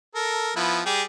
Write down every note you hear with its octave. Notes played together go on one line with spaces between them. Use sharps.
A4 A#4
F3 B3 E4
G3 G4 G#4